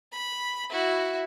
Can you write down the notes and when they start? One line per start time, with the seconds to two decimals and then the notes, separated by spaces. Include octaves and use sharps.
0.12 B5
0.70 E4 F#4